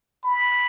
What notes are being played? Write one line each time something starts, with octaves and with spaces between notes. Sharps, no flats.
B5